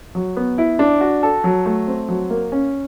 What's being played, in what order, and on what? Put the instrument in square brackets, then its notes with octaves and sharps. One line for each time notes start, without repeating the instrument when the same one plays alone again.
[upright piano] F#3
B3
E4
D4
F#4
A4
F#3
A3
C4
F#3
A#3
C#4